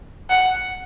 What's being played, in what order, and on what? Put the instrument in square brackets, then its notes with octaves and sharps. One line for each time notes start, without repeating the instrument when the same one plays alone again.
[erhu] F#5